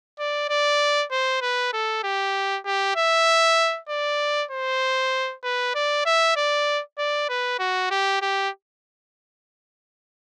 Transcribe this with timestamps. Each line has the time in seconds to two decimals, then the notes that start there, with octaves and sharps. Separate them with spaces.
0.19 D5
0.49 D5
1.11 C5
1.41 B4
1.73 A4
2.04 G4
2.65 G4
2.96 E5
3.89 D5
4.51 C5
5.43 B4
5.75 D5
6.06 E5
6.36 D5
6.98 D5
7.29 B4
7.59 F#4
7.90 G4
8.22 G4